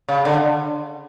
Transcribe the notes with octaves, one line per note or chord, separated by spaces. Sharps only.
C#3
D3